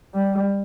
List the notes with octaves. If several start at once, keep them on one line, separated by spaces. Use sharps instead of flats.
G3